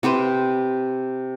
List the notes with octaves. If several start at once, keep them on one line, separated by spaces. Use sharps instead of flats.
C3 G4 B4 C5